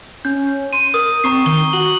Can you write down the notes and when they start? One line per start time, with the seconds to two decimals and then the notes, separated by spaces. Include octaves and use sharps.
0.25 C#4 G6
0.73 C6 D#7
0.94 A#4 D#6
1.24 C4 A#5 C#6 C7
1.46 D#3 G7
1.73 F#4 F#7